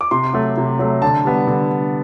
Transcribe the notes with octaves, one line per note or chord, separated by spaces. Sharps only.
D6
C3 C6
F#3 A3
C3
F#3 A3
D3 A5
G3 B3
D3